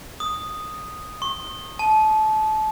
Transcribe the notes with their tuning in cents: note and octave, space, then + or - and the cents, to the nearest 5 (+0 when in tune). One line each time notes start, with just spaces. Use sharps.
D#6 -5
C#6 -45
A5 -25